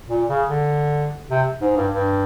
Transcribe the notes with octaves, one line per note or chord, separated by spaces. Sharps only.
A#2
C#3
D3
C3
G#2
G2
G2